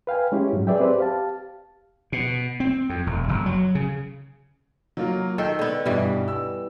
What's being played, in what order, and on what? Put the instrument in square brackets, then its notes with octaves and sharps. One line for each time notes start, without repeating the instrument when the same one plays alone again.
[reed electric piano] B4 F5 G5 G#5
G#3 C#4 E4 G4
G#2 F#3
G#4 B4 D5 E5 G5
C4 G4 B4 C5 D5
G4 F5 A5
[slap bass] B2
C4
F2
E1
F#1
F#3
C#3
[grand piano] F#3 A#3 F4
[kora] D#3 A4 [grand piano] G5
[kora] D3 B3
[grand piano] G2 B2 [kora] E3 G3
[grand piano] E6